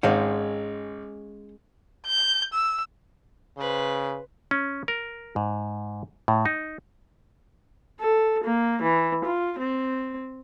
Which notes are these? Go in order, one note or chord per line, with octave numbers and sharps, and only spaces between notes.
G#1 G#3 C#4 C5 F5 F#5
G6
E6
C#3 B4 C5
C#4
A#4
G#2
A2
D#4
A4
A#3
E3
F4
C4